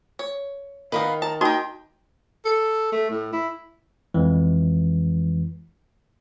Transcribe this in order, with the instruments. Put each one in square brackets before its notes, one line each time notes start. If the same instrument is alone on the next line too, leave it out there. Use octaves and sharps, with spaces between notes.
[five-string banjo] C#5
[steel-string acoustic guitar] D#3 [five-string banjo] B3 A#4 B4 [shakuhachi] F5
[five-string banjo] A5 [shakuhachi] A#5
[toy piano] D#4 F#4 [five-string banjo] A#4 D#5 [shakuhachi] G5
[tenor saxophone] A4
A3
A2
E4
[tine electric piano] F2 E3 G#3